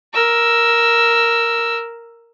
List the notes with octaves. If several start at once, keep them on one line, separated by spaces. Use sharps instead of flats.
A#4 E6